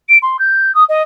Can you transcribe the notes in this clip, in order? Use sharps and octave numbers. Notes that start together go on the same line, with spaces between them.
D7
C6
G6
D#6
D#5